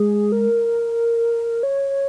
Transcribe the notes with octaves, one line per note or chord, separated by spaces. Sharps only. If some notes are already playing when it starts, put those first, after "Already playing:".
Already playing: G#3 G#4
A#4
C#5